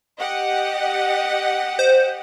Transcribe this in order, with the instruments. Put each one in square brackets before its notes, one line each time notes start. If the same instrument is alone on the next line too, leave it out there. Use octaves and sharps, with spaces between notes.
[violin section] G4 D#5 F#5
[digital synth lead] C5